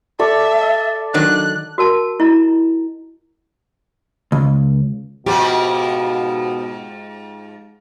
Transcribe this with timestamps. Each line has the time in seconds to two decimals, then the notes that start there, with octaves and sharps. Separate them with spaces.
0.19 A4 D5 E5 C#6
1.14 D#3 F#3 D4 F#6
1.78 F#4 A#4 A5
2.20 E4 D#5 A#5
4.32 C#2
5.26 G#2 B2 F3 G4